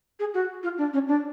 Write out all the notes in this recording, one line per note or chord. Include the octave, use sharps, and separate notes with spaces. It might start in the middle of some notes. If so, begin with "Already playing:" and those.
G#4
F#4
F4
D4
C#4
D4